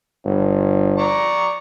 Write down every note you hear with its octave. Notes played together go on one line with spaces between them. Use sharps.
G1
D5 A#5 C#6